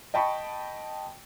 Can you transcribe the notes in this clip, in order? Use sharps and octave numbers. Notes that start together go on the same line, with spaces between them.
D#5 G5 A5 B5 C#6